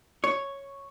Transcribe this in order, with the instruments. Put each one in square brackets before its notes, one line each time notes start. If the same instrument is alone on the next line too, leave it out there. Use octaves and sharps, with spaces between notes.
[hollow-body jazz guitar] C#5